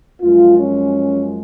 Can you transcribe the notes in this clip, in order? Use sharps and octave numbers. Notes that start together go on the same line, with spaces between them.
F#2 F3 G#3 F4
C#4